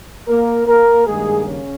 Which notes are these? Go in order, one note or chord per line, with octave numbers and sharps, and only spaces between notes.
A#3 A#4
A#3 A#4
G2 D#3 G#3 A#3 G#4
C#3 C#4